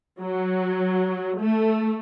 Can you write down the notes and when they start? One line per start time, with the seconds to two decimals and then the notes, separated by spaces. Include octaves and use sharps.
0.20 F#3
1.39 A3